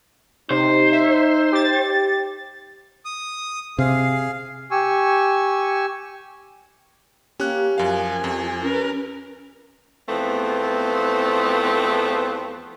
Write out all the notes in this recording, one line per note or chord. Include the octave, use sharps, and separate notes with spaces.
C3 D#4 C5
E5
G4 A6
D#6
C3 G#4 F5
G4 G#5 C#6 E6
A#3 C#4 G4 F#6
F#2 F3 A#4 F5 G#5
F2
C#4 A#4 B4
E2 F3 A3 B3 C4